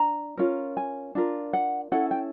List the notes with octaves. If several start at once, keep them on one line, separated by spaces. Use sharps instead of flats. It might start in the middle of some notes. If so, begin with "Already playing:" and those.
Already playing: D4 A#5
C#4 F4 A#4
G#5
D4 F4 A#4
F#5
C#4 E4 A4 F#5
G5